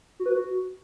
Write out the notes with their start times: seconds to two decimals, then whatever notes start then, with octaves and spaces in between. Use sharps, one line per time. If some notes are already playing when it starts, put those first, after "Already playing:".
0.20 F#4
0.26 B4
0.32 F#4